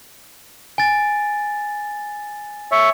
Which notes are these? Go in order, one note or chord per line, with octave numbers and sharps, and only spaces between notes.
G#5 A6
C#5 E5